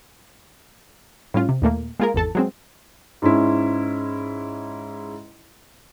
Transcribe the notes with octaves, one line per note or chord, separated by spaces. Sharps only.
A2 G3 C#4 F4
C3
D#2 A#2 A3 A#3
G#3 A#3 F4 G#4 A#4
G#1 E2 A4 A5
F#3 G#3 C4
G#2 G#3 C#4 E4